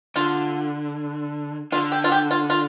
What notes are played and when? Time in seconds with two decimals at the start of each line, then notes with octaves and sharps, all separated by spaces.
0.16 D3 F4
1.72 D3 F4
1.92 G4
2.04 F4
2.12 G4
2.31 F4
2.50 F4